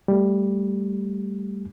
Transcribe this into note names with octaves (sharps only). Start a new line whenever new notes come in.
G3 A3